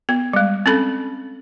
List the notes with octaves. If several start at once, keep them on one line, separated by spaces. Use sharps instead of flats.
B3
G3 G#3
C4 C#4 A4 B5